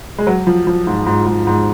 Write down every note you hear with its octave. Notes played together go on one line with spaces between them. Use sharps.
G#3
F#3
F3
F3
G#2
G#2
G#2
G#2